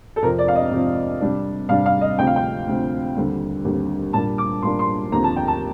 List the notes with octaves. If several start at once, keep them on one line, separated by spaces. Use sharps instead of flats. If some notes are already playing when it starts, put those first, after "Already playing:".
A4
F2 C3 F3 C4 A#4
D5
F5
D#5
F2 C3 F3 C4
C3 G3 D4
C3 G3 D4 F5
F5
D#5
D2 C3 F3 C4 G5
F5
G5
D2 C3 F3 C4
D#2 D3 G3 C4
D#2 D3 G3 C4
A#2 G3 A#3 D4 A5
D6
A#2 G3 A#3 D4 C6
C6
D#2 D3 F3 C4 A#5
A5
G5
A5